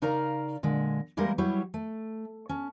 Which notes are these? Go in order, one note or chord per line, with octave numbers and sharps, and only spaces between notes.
C#3 D#4 A#4 D5 F5 A#5
A#2 D3 G#3
E3 G3 G#3 A#3 G4 A#4
F#3 G3 E4 G4 C#5
A3
C#4 A5